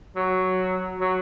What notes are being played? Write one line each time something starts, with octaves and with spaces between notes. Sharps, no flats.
F#3
F#3